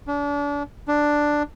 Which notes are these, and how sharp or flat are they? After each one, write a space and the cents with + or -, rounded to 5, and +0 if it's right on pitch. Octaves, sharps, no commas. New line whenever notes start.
D4 -35
D4 +5